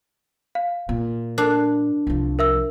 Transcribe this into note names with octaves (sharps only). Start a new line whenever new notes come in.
F5
A#2
D4 A#4 F#6 C7
C2 F3
A#4 E5 E6